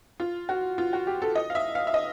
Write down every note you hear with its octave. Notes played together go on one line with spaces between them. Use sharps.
F4
F#4
F4
F#4
G4
A4
D#5
F5
E5
F5
E5
D#5